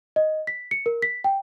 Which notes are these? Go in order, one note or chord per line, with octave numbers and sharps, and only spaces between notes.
D#5
B6
C#7
A#4
B6
G5